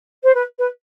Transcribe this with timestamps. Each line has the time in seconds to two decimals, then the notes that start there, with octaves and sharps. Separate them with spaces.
0.23 C5
0.34 B4
0.58 B4